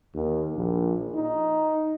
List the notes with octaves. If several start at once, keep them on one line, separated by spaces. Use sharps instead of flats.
D#2
A#1
D#4